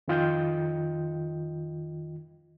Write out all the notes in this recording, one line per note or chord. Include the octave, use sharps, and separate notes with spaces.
F2 D#3 F4 D#5 G5 G6